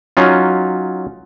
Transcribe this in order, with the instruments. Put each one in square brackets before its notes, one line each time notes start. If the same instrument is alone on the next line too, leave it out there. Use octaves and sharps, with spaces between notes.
[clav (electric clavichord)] F#3 C#4 D#4 F4